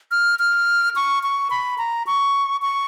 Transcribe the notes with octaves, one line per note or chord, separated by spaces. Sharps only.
F6
F6
C#6
C#6
B5
A#5
C#6
C#6